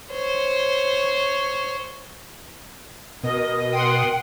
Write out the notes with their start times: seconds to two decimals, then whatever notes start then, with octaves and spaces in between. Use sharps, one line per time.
0.12 C5 C#5
3.23 B2 A#4 D#5
3.72 F#5 G5 C6 D#6